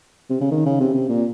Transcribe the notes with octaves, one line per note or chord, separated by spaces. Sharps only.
C3
C#3
D#3
C#3
C3
C3
A#2